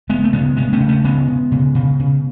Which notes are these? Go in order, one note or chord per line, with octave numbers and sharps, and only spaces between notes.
C#3 G#3 B3
A3
C#3 G#3 B3
C#3 G#3 B3
A3 C#4
C#3
A3 C#4
C#3 G#3 B3
C#3
C#3
C#3
C#3